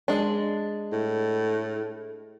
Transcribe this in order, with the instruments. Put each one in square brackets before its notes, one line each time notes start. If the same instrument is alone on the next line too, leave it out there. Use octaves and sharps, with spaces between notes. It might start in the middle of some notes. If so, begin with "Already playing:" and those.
[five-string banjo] G#3 D4
[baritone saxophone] A2